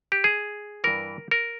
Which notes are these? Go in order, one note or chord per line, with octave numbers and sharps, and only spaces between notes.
G4
G#4
G2 E3 A#4
A#4